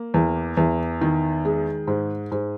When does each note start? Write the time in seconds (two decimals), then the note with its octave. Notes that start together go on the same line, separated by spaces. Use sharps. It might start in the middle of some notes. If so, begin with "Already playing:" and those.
Already playing: A#3
0.14 E2
0.57 E2
1.01 D#3
1.45 G#3
1.87 G#2
2.31 G#2